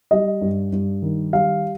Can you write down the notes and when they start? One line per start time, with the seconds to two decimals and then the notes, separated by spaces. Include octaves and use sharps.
0.11 G3 D#5
0.41 G2
0.72 G2
1.02 D#3
1.33 G3 F5